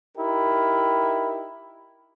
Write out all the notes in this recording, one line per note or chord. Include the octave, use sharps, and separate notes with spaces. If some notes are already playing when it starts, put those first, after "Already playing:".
D#4 E4 G4 A#4